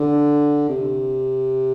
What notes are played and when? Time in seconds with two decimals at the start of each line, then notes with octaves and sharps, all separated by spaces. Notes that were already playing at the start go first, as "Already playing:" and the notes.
Already playing: D3
0.69 C3